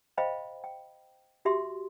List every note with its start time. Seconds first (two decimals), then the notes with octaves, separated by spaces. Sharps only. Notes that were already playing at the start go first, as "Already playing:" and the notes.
0.18 C5 D#5 F5 G5 B5
0.64 G5
1.45 F#4 G4 E5 C6